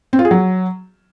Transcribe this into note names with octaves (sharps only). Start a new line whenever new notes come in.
C4
F4
G#4
F#3